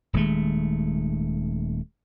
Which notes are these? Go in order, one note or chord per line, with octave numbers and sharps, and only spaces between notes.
D#1 D#3 G#3 A3